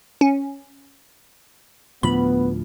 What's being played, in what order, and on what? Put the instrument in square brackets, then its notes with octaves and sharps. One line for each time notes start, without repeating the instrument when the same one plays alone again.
[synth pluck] C#4
[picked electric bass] D2 A2 F3 [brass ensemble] B3 [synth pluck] B5